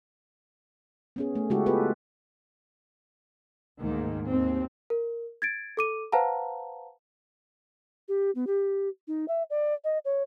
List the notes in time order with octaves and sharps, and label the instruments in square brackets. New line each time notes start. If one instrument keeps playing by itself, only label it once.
[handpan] B3 C#4 G#4
A3
C#3 G#3 E4 F#4 G4 A4
B3 F4 G4 A4 B4
[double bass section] D2 G#2 D#3 A#3
D#2 C4
[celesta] A#4
G#6 A6 D7
A4 D6 D#7
B4 C5 F5 F#5 A5 A#5
[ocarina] G4
B3
G4
D#4
E5
D5
D#5
C#5